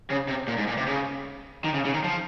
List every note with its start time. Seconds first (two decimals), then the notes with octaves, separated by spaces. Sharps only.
0.10 C#3
0.28 C3
0.48 A#2
0.58 G#2
0.68 A#2
0.78 C3
0.87 C#3
1.64 D#3
1.74 C#3
1.85 C#3
1.94 D#3
2.04 F3